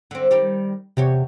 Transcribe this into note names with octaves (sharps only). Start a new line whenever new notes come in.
D3 C4
D#3 G3 G4
E2 C3 G4 C#5